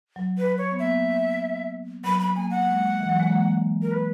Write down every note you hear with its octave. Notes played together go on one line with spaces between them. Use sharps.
F#3
B4
C#5
B3
A#3 E5
F#3 B5
B5
A#3 G#5
F#5
G#3
E3
F#3
G#3
A#3
A#4
B4